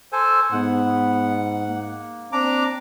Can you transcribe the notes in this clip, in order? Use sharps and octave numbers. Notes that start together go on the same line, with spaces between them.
A4 C5 G#5
G#2 B3 F#5
A#3
C4 D4 A#5 D6